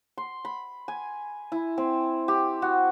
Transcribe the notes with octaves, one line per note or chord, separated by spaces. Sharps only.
C6
B5
G#5
E4
C4
G4
F#4